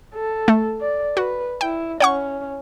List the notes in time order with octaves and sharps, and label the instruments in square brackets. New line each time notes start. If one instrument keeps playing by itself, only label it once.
[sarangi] A4
[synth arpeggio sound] A3
[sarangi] D5
[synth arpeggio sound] F#4 [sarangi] B4
[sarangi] E4 [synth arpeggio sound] G5
[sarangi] C#4 [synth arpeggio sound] C#5 F#5 C#6